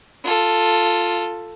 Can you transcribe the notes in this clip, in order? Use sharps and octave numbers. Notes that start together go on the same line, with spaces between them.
F4 A4